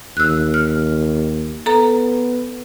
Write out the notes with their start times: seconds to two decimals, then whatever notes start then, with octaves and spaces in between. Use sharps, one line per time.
0.17 D#2 E6 F#6
0.54 F6
1.66 B3 A4 A#5